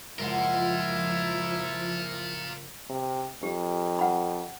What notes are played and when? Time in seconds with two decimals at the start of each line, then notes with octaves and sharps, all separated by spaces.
0.19 F#1 F3 G#3 E4 F4 A#4 F#5
2.90 C3
3.43 F2 G4
3.99 F#5 B5